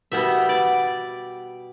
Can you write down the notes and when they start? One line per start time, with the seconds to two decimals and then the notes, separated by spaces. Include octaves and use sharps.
0.12 B2 G3 B3 E5
0.49 D5